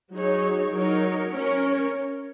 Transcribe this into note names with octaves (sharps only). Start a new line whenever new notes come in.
F#3 D#4 G#4 C#5
F#3 D#4 A#4 C#5
C#4 A#4 C#5